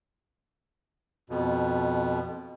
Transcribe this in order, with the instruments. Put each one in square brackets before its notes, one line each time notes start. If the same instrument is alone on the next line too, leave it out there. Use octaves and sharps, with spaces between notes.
[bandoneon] F2 B2